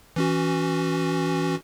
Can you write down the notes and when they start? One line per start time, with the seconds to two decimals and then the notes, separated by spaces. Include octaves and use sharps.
0.16 E3 C#4 F#4